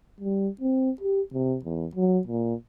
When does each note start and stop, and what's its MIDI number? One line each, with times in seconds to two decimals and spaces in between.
0.20 0.48 55
0.61 0.90 60
1.01 1.21 67
1.33 1.57 48
1.65 1.86 40
1.95 2.19 54
2.27 2.54 46